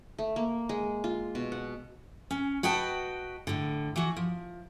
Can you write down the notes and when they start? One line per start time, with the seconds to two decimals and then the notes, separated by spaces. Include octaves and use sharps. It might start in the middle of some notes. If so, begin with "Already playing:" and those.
0.18 A3
0.36 A#3
0.69 G#3
1.04 F4
1.35 B2
1.52 F#5
2.31 C#4
2.63 F#4 B4 D#5 G5 A5
3.47 A2 D3
3.96 E3 F#4
4.16 F3